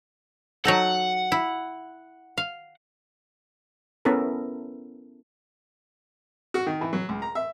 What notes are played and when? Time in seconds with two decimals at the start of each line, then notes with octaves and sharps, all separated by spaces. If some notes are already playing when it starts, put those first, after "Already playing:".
0.65 F#3 D#4 A4 F#5
1.32 E4
2.38 F5
4.05 B3 C#4 E4 A4 A#4
6.54 F#4
6.66 D#3
6.81 E3
6.93 F#3
7.09 C#2
7.22 A#5
7.35 E5